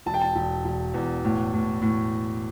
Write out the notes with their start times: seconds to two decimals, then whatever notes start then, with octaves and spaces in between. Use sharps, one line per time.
0.06 E1 A5
0.14 G5
0.21 A5
0.35 E1
0.65 E1
0.94 E2
1.24 A2
1.54 A2
1.82 A2